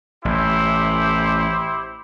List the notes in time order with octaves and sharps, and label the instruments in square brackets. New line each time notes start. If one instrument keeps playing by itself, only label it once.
[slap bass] A1 [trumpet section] E4 G4 C5